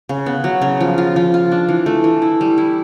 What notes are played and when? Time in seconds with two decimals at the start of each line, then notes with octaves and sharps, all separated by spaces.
0.09 C#3
0.26 B3
0.44 F#3
0.62 C#3
0.81 F3
0.98 F4
1.16 F3
1.34 F4
1.52 D4
1.69 E3
1.86 A3
2.04 E3
2.22 E4
2.41 G3
2.58 E4